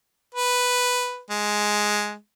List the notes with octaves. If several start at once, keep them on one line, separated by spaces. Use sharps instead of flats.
B4
G#3